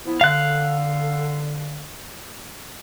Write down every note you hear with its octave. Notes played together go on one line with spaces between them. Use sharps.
F3 B3 E4
D3 F5 F#6